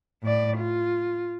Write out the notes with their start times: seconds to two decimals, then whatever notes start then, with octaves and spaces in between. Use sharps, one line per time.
0.23 A2 D5
0.57 F4